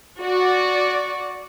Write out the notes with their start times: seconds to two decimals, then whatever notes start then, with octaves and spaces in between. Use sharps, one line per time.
0.20 F#4 D5